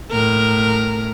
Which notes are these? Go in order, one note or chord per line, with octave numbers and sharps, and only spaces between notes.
A2 A#4